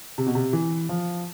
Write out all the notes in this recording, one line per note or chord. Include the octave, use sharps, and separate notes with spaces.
C3
B2
C3
E3
F3